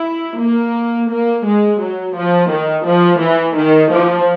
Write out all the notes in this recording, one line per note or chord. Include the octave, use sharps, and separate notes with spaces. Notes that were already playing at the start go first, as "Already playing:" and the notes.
Already playing: E4
A#3
A#3
G#3
F#3
F3
D#3
F3
E3
D#3
F3